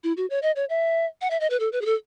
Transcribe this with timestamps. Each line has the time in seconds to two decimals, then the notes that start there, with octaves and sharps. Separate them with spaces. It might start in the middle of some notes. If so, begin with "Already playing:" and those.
0.04 E4
0.17 F#4
0.30 C#5
0.42 D#5
0.56 C#5
0.69 E5
1.21 F#5
1.31 E5
1.40 D#5
1.50 B4
1.60 A4
1.72 B4
1.81 G#4
1.85 A4